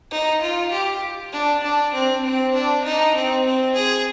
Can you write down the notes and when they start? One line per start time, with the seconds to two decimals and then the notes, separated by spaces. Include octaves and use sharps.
0.11 D#4
0.42 F4
0.72 G4
1.33 D4
1.63 D4
1.93 C4
2.24 C4
2.54 D4
2.84 D#4
3.15 C4
3.46 C4
3.75 G#4